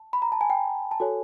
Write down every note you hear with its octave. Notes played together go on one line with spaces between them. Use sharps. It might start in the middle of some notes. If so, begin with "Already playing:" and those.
Already playing: A5
B5
A#5
A5
G#5
G5
A5
F#4 A4 C#5 G#5